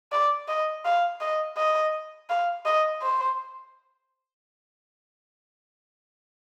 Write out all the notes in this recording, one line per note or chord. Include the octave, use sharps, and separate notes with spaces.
D5
D#5
F5
D#5
D#5
F5
D#5
C5